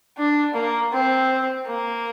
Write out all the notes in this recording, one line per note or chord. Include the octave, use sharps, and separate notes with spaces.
D4
A#3
C4
A#3